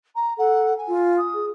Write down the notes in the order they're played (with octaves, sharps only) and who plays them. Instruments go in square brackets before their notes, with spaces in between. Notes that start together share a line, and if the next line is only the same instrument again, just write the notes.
[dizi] A#5
[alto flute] A4 [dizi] F#5
[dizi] G#5
[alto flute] F4
[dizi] D#6
[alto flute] G#4